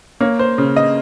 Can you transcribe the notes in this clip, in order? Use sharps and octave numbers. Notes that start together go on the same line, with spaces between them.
A#3 C#5
C5
C#3
D#5